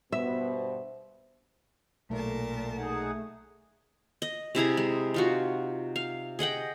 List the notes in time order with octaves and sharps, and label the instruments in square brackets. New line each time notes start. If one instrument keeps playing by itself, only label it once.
[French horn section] G2 B2 C5 [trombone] B3 [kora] E5
[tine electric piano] B1 [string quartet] A#2 A#4 A5 [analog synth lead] A3
[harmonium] D#4 G#4 F#5
[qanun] D#5
C3 E4 G#4 A#5
G#3
D#4 F4 F#4
F5
G#4 D#5 F#5 G5